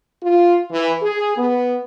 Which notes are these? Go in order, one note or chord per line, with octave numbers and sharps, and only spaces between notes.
F4
E3
G#4
B3